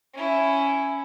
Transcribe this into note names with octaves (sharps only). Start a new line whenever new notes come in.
C#4 E4